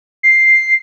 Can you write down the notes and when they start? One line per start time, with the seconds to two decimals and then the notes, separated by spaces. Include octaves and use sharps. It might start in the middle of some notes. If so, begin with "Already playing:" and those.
0.23 C7